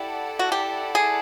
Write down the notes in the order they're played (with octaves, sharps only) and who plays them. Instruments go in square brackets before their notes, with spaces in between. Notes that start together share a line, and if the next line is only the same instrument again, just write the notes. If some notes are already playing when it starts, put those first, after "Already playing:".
Already playing: [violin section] E4 A4 D5 F#5 [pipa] G4
[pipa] F#4
G4
G#4